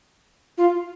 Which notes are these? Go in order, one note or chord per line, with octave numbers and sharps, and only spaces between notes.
F4